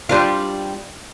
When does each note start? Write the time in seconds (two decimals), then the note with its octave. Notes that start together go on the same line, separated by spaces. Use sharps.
0.09 G3 D4 F4